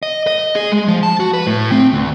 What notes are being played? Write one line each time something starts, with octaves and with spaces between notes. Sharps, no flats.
D#5
D#5
G#4
G#3
F3
A5
F#4
B4
A2
C4
D2